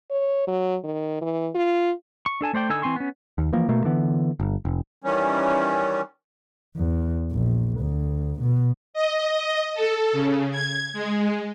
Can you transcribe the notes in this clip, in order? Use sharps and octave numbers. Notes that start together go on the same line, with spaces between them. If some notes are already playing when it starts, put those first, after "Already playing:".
C#5
F#3
D#3
E3
F4
C#6
D4 A4 G#5 A5
A3 C5 D5 G5
D3 D#4 A4 G#5 E6
E3 C4 G#5 C6 C#6
B3 C#4
D#2
E3 F3 A#3
B2 A3 A#3
D3 E3 B3
G1
F1
D#3 E3 G3 C#4
E2
A#1
D2
B2
D#5
A4
C#3
G#6
G#3